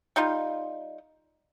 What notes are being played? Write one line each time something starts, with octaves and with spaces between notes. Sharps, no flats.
G3 D#4 F4